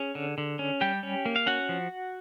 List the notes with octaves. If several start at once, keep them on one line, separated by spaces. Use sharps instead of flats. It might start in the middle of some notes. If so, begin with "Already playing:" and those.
Already playing: C#4 G#4
D3
D3
C#4
G3 G4 G5
C#4
A#3
F5
C#4 F#4 F#5
F3